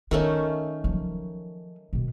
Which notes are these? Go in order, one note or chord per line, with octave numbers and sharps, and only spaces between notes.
D#3 A3 C#4 F4
F3 F#3
B2 D#3